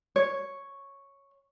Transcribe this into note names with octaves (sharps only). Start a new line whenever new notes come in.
C#5